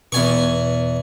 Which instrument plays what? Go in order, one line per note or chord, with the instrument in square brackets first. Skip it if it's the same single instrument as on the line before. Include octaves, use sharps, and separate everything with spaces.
[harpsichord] E2 G#5 C#6 [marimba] B2